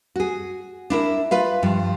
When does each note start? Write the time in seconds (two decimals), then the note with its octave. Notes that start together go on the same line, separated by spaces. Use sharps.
0.16 F#4 G#4
0.90 D4 E4 A#4
1.31 F4 B4 F5
1.62 G2 F3